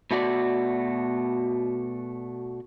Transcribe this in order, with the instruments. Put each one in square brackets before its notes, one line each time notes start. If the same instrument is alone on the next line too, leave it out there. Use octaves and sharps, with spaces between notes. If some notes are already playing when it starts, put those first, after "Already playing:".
[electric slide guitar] B2 A3 F#4 D5